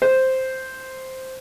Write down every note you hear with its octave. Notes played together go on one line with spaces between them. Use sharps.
C5